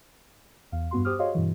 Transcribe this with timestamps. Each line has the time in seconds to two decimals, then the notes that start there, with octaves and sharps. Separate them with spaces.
0.72 E2 F5
0.91 G2 B3 F#4 C6
1.05 G4 C5 D6 D#6 F6
1.19 F#4 G#4 C#5 D#5 F5 C6
1.35 G2 B2 E3